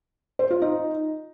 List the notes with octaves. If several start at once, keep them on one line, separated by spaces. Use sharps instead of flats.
C5
F4
D#4